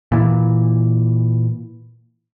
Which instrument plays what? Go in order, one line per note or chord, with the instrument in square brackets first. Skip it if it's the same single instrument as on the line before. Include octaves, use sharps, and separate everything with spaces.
[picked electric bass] A#2 E3